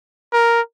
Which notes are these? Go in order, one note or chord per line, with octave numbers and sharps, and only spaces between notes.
A#4